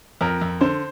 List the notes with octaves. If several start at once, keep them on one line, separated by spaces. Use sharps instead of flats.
F2 A#4
F2
D3 C5